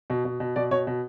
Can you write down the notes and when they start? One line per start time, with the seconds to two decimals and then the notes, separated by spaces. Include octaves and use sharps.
0.10 B2
0.25 B2
0.40 B2
0.56 B2 D5
0.71 B2 C#5
0.87 B2